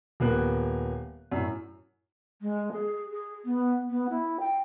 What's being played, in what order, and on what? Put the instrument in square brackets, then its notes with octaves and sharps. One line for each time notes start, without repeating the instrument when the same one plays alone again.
[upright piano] D#1 A#3 B3 F#6
F#2 A2
[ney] G#3
G#4
G#4
B3
B3
E4
G5